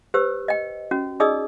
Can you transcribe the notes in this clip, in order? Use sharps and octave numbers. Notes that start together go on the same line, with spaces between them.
G4 B4 C5 E6
D#5 G5
C#4 F#4
D#4 G#4 D5 D#5 D#6 E6